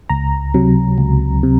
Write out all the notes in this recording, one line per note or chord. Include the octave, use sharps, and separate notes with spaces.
C#2 A#5
C3 F#3
C#2
C3